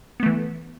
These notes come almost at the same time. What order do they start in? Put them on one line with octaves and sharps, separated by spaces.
B3 A3 E3